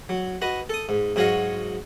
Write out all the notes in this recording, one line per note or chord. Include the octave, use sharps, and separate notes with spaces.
F#3
F#4 B4 D#5
A4 D#6
G#2
G#2 F#3 F#4 C#5 D#5 F5